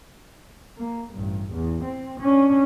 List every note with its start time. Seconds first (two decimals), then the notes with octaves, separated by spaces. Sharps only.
0.78 A#3
1.14 A1 G2
1.53 E2
1.85 C4
2.21 C#4 D4